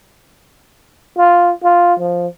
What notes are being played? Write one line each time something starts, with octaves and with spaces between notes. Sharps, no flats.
F4
F4
F3